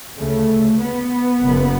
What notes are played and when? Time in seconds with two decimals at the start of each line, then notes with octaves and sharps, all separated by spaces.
0.18 D2 C#3 A3
0.80 B3
1.42 F#1 F#2 C#3